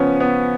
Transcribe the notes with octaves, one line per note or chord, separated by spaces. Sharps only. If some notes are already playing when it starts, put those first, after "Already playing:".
Already playing: C#3 F3 B3 C#4
B3